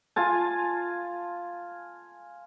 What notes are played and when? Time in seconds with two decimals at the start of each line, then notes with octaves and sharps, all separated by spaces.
0.16 F4 G#5 A5